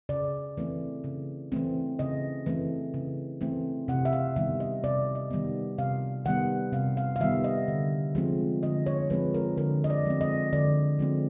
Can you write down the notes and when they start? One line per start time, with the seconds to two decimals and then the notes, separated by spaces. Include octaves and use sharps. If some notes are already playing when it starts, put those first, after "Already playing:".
0.09 C#3 D5
0.57 E3 A3 C4
1.04 C#3
1.52 E3 A3 C4
1.99 C#3 D#5
2.46 E3 A3 C4
2.94 C#3
3.41 E3 A3 C4
3.88 C3 F#5
4.05 E5
4.13 F5
4.36 D#3 G3 B3 E5
4.60 D#5
4.84 C3 D5
5.15 D#5
5.31 D#3 G3 B3
5.78 C3 F5
6.25 D#3 G3 B3 F#5
6.73 C3 F5
6.97 F5
7.16 F5
7.20 D#3 G3 B3 E5
7.44 D#5
7.68 D3
8.15 F3 G#3 C4
8.63 D3 D#5
8.86 C#5
9.10 F3 G#3 C4 B4
9.34 A#4
9.57 D3 A#4
9.84 D#5
9.90 D5
10.06 F3 G#3 C4
10.21 D#5
10.53 D3 D5
10.99 F3 G#3 C4